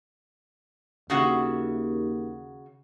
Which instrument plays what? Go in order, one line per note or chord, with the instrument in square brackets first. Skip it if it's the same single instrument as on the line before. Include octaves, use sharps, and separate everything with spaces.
[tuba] D#2 [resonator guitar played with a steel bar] C#3 F#4 E5